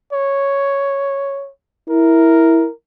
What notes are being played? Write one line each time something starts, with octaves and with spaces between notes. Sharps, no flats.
C#5
E4 A#4